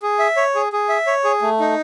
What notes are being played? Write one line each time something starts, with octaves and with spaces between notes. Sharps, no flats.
G#4
E5
C#5
G#4
G#4
E5
C#5
G#4
A3
D#4